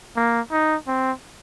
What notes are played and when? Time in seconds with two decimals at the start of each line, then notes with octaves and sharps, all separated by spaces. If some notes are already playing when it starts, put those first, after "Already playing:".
0.17 A#3
0.51 D#4
0.87 C4